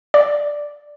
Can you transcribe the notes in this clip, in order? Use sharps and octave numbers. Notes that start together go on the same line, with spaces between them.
D5